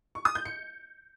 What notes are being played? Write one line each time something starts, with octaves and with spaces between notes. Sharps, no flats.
C#6
D#6
G6
C#7